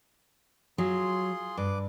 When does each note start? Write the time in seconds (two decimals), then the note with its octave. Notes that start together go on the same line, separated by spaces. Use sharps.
0.78 F#3 F4 G#4 C6
1.57 G2 B4 D6